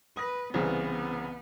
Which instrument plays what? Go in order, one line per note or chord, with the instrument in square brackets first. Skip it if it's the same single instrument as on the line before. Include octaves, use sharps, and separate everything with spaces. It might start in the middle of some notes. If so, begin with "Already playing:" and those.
[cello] B4 [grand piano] D#6 A#6
[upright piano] C2 C#3 [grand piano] E3 C4 [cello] B3